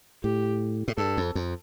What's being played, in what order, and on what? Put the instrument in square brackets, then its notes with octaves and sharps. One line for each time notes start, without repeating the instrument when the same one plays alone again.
[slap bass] A2 [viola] G4
[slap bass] A2
[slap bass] G2 [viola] A4
[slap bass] F2
F2